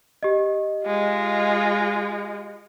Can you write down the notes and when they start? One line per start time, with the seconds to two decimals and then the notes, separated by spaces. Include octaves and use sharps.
0.23 G4 D#5
0.84 G#3 F4